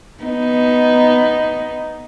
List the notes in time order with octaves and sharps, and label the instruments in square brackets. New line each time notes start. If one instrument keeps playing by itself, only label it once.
[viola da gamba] B3 D#4